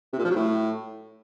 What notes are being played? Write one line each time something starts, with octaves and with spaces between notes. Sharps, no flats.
C3
A#2
F3
F#3
A2